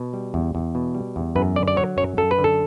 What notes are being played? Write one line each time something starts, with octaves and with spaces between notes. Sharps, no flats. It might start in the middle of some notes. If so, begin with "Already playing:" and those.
Already playing: B2
G3
E2
E2
B2
G3
E2
F#2 B4
D3 D5
D5
F#3 C#5
F#2 C#5
F#2 A4
B4
D3
A4